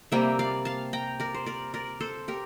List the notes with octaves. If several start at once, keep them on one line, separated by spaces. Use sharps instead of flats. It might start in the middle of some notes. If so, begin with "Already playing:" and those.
C3 G3 A#3 E5 G5
D5 F5
F5 A5
G5 A#5
A#4 D5
C5
A#4 D5
A#4 D5
A4 C5
G4 A#4